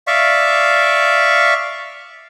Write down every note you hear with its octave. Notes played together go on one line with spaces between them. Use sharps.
D5 E5 F5 C#6